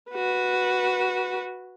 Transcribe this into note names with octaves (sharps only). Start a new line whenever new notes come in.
F#4 B4